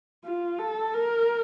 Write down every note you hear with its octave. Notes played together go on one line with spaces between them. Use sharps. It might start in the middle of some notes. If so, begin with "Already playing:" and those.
F4
A4
A#4